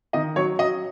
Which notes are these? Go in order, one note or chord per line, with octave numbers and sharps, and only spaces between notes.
D#3 D#5
F#3 C#5
F#3 D#5